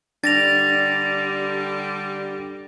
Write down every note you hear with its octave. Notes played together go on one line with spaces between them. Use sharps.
D3 G3 D4 A6 A#6 F7